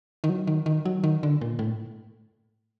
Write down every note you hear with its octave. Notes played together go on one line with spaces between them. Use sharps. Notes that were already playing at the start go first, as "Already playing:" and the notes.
D#3
F#3
D#3
D#3
F#3
D#3
D3
A#2
A2